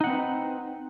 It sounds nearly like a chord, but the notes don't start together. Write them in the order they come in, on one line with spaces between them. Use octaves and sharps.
D#4 F#5 C4 B4